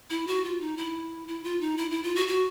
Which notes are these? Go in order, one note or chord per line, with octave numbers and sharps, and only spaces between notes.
E4
F#4
F4
D#4
E4
E4
F4
D#4
E4
E4
F4
F#4
F#4